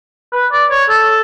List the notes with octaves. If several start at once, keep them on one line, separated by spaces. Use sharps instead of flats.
B4
D5
C#5
A4